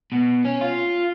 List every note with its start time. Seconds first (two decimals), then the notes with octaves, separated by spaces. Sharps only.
0.12 B2
0.44 C#4
0.61 F4